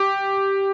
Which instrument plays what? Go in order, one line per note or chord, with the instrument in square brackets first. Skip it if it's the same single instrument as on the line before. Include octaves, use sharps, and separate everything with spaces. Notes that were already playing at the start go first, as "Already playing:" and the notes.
Already playing: [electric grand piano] G4